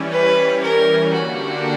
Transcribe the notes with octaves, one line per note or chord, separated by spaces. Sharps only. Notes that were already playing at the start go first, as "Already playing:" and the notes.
Already playing: E3 G3 C#4
B4
A#4
D3 A#3 D4 F#4 G4